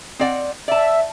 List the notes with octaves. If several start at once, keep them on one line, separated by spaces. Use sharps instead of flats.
C4 D5 F#5
D5 E5 A5